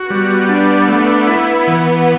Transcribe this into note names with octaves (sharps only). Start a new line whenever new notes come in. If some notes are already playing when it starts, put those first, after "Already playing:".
Already playing: F#4
G3 B3
D4
A3
E4
E3